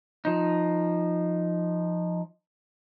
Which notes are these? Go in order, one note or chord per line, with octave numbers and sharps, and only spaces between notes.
F3 D#4